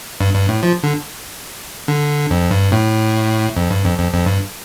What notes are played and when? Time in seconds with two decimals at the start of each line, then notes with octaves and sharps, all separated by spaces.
0.21 G2
0.34 G2
0.49 A2
0.63 F3
0.83 D3
1.88 D3
2.30 F2
2.51 G2
2.72 A2
3.57 F2
3.70 G2
3.85 F2
3.98 F2
4.12 F2
4.26 G2